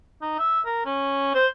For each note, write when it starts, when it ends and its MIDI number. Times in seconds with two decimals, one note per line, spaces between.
0.22 0.34 63
0.39 0.61 76
0.66 0.83 70
0.85 1.34 61
1.34 1.46 72